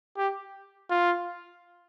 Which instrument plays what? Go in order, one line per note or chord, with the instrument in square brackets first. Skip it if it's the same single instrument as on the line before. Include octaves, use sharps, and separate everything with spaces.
[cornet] G4
F4